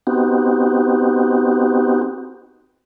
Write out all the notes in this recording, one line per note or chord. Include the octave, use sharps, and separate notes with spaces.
B3 C4 D#4 F#4 G4